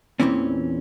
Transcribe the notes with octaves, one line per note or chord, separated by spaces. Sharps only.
E2 A#2 E3 C4 C#4